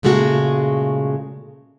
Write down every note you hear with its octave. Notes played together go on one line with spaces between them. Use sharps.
A#2 C#3 G#3 A3 F#4